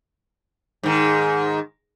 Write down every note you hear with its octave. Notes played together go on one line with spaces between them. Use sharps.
G#2 D#3